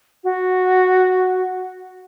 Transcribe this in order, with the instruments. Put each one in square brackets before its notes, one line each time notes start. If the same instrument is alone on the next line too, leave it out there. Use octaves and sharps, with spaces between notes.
[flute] F#4